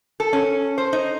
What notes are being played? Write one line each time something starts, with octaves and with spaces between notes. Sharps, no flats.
A4
C#4
C5
D#4